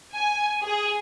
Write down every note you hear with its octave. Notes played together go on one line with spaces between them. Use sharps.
G#5
G#4